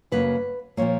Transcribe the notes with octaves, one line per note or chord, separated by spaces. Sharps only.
F#2 C#3 F#3 A#3 B4
A#2 F3 A#3 C#5